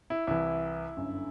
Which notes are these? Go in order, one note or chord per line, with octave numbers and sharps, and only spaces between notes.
E4
C2 C3 E3 E4
G1 F#2 D3